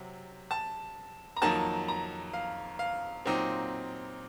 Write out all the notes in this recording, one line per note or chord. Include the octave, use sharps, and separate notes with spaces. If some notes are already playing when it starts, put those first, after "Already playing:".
Already playing: C3 F#3
A5
A#5
F2 D#3 F#3 A#3 D#4 A5
A#5
F5
F5
A#2 F#3 C4 D#4